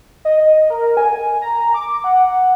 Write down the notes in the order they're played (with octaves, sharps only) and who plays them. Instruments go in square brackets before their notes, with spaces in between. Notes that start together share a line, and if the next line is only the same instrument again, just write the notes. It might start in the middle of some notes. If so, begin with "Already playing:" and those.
[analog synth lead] D#5
A#4
G#5
A#5
D6
F#5